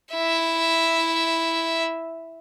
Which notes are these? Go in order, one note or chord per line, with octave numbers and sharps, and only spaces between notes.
E4 E5